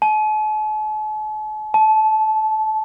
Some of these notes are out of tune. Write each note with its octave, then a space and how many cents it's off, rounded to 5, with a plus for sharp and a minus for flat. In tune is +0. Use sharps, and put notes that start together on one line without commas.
A5 -45
A5 -20